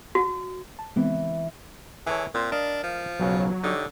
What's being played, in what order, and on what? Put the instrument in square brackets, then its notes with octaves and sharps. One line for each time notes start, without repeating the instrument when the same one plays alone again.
[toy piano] F#4
[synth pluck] A5
[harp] E3 [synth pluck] G#3 B3 C4
[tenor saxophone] E3 [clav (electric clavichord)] G#4 A4 C#5
[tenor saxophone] A#2 [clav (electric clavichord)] C4 C5
[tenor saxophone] D4 [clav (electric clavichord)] A#4 D#5 F5
[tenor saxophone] F3
[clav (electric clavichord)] B1 C#3 F#5 [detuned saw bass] F#3
[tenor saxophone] D3 [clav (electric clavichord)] D#4 G4 C#5